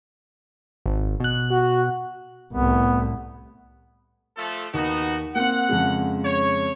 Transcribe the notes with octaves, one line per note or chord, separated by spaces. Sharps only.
G#1
B2 F#6
F#4
C2 A2 B3
F3 A3 A4
D#2 B3 D#4 F#4
A#3 C4 F#5
F2 C#3 G#3
C#5